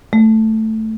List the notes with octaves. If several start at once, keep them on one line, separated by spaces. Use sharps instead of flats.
A3